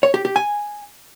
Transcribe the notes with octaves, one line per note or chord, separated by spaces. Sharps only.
C#5
G4
G4
G#5